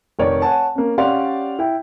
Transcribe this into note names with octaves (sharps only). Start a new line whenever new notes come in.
F1 D#3 C#5 D5
C#5 F#5 G#5 A5
A#3 C#4
C#4 G4 D5 F5 F#5 C6
E4 G5